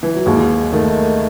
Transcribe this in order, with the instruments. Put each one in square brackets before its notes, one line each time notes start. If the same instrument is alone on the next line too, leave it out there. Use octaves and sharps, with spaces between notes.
[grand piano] E3
F#3
[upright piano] D#2 [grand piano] G#3
[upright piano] D#3 [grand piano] A3